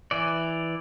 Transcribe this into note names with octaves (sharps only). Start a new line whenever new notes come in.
E3 D5